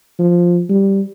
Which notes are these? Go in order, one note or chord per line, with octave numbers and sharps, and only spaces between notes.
F3
G3